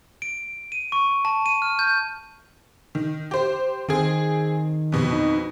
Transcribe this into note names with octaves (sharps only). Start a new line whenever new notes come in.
D7
D#7
C#6
A5
D#7
F6
G6
D#3
G4 C5
D#3 C4 G#4
F2 B2
D#4